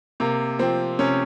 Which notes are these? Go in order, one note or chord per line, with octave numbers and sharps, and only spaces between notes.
C3 A#3
F3 C4
C3 C#4